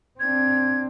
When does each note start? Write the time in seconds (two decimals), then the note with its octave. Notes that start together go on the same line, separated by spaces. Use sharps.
0.20 C4 D4 G#6